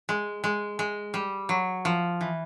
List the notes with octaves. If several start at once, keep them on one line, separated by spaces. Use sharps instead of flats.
G#3
G#3
G#3
G3
F#3
F3
E3